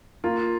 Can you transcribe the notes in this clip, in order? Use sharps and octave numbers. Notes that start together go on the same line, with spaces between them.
A#3 F4